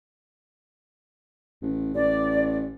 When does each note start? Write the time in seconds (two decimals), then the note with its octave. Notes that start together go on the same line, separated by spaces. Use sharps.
1.62 A1
1.94 A1 D5